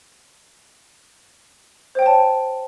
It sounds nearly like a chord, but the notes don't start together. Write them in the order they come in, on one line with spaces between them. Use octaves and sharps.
C5 G5 C#5 A5